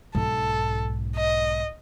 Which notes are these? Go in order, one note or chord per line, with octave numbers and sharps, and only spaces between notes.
B1 G#2 A4
D#5